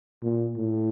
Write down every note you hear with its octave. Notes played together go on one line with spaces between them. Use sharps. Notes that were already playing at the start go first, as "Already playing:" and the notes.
A#2
A2